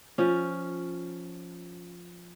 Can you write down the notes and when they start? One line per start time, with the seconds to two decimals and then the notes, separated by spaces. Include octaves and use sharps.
0.18 F3 C#4